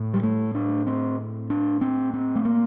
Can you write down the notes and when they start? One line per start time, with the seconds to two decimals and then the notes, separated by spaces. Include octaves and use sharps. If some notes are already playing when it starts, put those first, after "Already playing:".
Already playing: A2
0.14 G3
0.23 A3
0.55 D4
0.87 C4
1.50 D4
1.81 C4
2.13 C4
2.35 A3
2.45 A#3